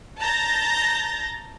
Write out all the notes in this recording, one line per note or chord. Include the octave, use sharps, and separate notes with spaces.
A5 A#5 G6 A6 A#6